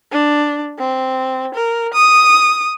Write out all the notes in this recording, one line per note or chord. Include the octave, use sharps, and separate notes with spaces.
D4
C4
A#4
D#6